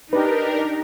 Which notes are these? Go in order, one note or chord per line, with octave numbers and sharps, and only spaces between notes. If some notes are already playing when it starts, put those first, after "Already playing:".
D4 D#4 G4 A#4 B4